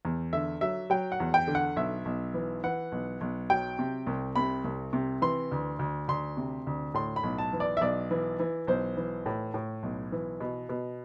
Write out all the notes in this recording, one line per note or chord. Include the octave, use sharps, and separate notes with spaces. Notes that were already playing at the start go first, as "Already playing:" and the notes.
E2
D3 E5
F#3 E5
F#3 G5
F#5
E2
G5
D3
F#5
B1 E5
B1
E3
E3 F#5
B1
B1
F#3 G5
C3
C2
C3 B5
C2
C3
E3 C6
D2
D2
D2 C6
C3
D2
A2 C6
B5
B1
A5
E3
D5
E5
B1 D5
E3
E3
B1 C5
E3
A2
A2
B1
E3
B2
B2